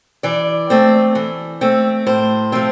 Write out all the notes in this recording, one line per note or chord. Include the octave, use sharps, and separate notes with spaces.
E3 D5
A3 C4
E3
A3 C4
A2 C5
F3 A3 C4